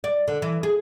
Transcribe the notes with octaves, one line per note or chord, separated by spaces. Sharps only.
D5
D3
E3
G#4